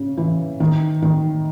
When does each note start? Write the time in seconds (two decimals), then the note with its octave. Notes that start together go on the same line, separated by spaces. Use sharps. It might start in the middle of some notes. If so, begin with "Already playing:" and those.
Already playing: C#3
0.18 E3
0.60 D#3
1.02 D#3